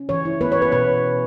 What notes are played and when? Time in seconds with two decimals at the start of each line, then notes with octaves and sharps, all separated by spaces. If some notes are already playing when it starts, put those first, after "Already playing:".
Already playing: C#4
0.09 E3 C#5
0.25 E4
0.41 B3 B4
0.52 C#5
0.57 B3 B4
0.72 B2 B4